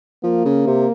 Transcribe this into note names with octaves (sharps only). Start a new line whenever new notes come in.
F3 A#3
C#3
C3